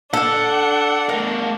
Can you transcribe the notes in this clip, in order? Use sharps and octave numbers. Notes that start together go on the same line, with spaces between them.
D4 A4 F5 F#5
A3 A#4 F5